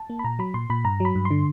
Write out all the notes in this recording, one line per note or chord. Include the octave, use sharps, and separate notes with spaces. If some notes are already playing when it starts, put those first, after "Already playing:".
Already playing: A5
A#3
B5
A#2 A#5
F#3 B5
A#2 C6
A#2 B5
G2 A#5
F#3 B5
G2
C6
D3